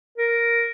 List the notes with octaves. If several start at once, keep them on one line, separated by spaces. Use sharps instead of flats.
A#4